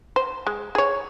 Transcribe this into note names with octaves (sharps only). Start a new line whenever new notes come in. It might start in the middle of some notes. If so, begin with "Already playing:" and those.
C5
G#3
G#4 C#5